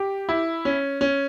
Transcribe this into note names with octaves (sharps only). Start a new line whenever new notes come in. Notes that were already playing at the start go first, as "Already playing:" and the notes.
Already playing: G4
E4
C#4
C#4